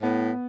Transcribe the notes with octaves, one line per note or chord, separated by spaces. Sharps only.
A2 B3